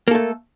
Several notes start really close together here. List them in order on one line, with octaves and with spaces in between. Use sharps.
A#3 A4 A3